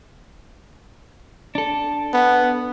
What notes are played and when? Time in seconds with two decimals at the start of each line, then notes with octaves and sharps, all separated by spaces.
1.55 D4 A4
2.13 B3